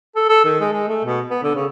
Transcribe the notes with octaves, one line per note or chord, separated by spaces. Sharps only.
A4
A4
D#3
G#3
G#3
A3
B2
B3
D3
C#3